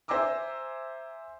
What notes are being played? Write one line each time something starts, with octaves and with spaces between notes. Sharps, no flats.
C5 E5 G#5 A#5 D6 E6